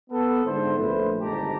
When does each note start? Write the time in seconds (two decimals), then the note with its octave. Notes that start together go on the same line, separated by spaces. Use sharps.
0.10 B3 A4
0.45 G#2 D3 E4 C5
0.77 A#1 A3 B4 C5
1.21 G1 G#2 D#3 G4 A5 A#5